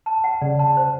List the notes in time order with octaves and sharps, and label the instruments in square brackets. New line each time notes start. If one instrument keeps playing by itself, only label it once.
[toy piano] A5
F#5
[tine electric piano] C#3 [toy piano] D5
[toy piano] A5
C5